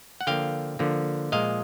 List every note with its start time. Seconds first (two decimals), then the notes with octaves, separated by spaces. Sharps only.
0.21 F#5
0.27 D3 F3 A#3 F5 G5
0.79 D3 F3 A#3
1.32 A#2 F3 G#3 D#5 F5